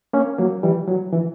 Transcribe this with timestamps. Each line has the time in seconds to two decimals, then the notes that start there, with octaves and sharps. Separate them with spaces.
0.13 A#3 C#4
0.38 F#3 A#3
0.63 E3 G3
0.88 F#3
1.12 E3